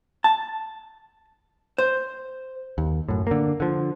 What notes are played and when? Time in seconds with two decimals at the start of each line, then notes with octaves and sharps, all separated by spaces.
0.24 A5
1.78 C5
2.78 D#2
3.08 F#2 A2
3.27 D3 A#3
3.60 D3 F3